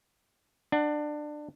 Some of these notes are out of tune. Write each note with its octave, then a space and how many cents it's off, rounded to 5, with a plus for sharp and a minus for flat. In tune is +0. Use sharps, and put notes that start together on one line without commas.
D4 +20 F#5 +0